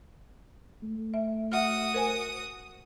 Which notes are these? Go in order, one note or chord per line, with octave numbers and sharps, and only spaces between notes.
A3
E5
F#4 E5 F#5 D#6 F6
A#4 C5 G#5